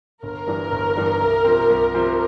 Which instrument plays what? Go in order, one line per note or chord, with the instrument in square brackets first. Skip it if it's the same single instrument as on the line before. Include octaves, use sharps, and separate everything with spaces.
[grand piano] G1 [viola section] A#4
[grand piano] G2 E3 G3 D4
G1
G2 E3 G3 D4
C2
C3 F3 C4
C2
C3 F3 C4